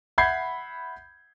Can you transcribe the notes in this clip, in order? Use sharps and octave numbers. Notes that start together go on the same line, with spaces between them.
E5 F#5 B5 G6 G#6 C7